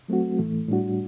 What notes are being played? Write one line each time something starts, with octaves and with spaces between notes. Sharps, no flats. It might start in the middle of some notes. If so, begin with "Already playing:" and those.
F#3 A3 C4 F#4
A2 E3 A3
A2 G3 D4 F#4